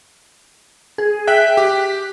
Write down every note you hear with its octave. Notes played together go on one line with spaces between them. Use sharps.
G#4
E5 G5 F#6 B6
G4